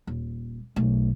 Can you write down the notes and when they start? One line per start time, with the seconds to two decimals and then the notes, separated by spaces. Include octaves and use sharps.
0.07 D#1
0.76 B1 A3